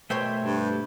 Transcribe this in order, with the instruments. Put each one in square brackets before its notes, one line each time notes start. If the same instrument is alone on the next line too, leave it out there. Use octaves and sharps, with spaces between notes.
[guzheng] B2 C5 C#5 [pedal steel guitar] A3 E5 G5
[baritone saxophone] G2